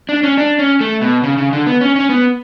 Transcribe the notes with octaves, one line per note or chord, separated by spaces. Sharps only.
D4
C#4
D4
C#4
A3
B2
C#3
C#3
D3
B3
C#4
C#4
B3